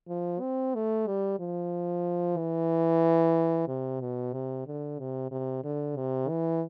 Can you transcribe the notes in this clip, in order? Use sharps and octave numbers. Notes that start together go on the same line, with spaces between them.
F3
C4
A3
G3
F3
E3
C3
B2
C3
D3
C3
C3
D3
C3
E3